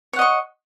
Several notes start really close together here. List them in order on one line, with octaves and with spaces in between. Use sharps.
C#5 F#5 D#5 C#6